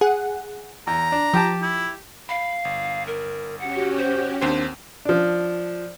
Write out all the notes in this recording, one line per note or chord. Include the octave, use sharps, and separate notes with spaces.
G#4 F#5
E2 A#5
D4
F3 G4 G5 A5
E4
F5 B5
G1
A#4
C#4 F#4 G4 F#5
C5
D#2 C4 D4 C5
F3 D4